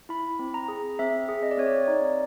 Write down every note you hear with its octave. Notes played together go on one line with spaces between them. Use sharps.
E4 B5
C4
A#5
G#4
C4 E5
G#4
D#5
D5
C4 C#5
D5
D#4